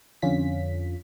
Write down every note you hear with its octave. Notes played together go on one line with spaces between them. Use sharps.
F2 D3 C#4 F4 B6